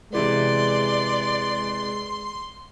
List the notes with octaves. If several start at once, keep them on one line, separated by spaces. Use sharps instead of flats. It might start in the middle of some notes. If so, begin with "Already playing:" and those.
C3 E3 G#3 B3 D5 C6